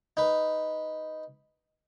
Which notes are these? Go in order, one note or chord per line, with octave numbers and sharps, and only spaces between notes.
D#4 B4